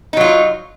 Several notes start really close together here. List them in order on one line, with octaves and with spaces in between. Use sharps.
D#4 F#3 F4